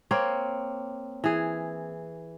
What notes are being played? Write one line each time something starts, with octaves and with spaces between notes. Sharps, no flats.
A#3 C4 C#5
E3 G#4